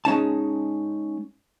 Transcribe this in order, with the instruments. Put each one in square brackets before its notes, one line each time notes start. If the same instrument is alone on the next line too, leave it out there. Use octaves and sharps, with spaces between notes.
[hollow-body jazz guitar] G#3 C#4 D#4 A5